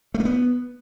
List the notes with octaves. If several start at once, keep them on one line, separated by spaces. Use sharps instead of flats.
A3
A#3
B3